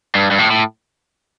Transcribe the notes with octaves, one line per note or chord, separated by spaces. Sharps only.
G2
G2
A2
A2